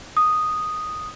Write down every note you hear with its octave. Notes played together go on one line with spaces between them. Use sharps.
D#6